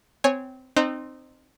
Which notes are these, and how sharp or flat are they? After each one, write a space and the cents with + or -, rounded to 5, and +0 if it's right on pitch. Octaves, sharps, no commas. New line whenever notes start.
C4 -20 C#5 -10 G#5 -15
C4 +0 D#4 -25